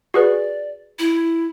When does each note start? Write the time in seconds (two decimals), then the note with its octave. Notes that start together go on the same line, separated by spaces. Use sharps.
0.14 F#4 G#4 B4 D5
0.99 E4